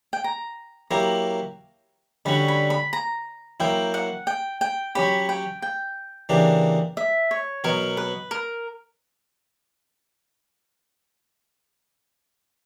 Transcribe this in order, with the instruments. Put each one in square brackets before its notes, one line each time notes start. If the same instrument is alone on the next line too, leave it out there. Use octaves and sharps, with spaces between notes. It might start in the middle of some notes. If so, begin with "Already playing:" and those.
[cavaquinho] G5
A#5
[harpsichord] F#3 A#3 E4 G4 [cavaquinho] A#5
[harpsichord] D3 G3 C#4 F#4 [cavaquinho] B5
[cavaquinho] B5
B5
A#5
[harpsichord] F#3 A#3 E4 [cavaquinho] G5
[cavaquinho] F#5
G5
G5
[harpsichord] F#3 C#4 G4 [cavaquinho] B5
[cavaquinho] G5
G5
[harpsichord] C#3 E3 A#3 D4 G4
[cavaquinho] E5
C#5
[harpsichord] B2 F#3 B3 F#4 [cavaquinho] A#4
[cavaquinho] B4
A#4